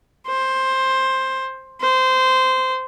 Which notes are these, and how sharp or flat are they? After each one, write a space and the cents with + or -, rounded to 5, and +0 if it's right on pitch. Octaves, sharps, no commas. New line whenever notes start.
C5 +10
C5 -15